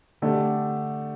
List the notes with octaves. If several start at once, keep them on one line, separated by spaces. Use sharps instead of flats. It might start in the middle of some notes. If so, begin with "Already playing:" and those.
D3 A3 D4 G4